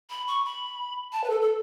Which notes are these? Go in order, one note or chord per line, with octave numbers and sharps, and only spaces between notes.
B5
C#6
B5
A5
B4
A4
A4